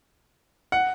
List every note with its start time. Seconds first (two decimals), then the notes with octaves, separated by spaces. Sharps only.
0.72 F#5